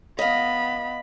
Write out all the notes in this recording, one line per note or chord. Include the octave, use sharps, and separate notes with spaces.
B3 D#5 F5 B5